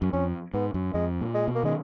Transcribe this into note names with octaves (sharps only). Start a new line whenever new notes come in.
F#2
F2 C#4
G#2 B3
F#2
F2 G#3
A#2
G#3
B2
A#3
D#3 G#3